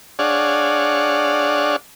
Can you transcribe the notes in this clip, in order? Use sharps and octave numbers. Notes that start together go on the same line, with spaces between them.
D4 G#4 C#5 D5 F5 F#5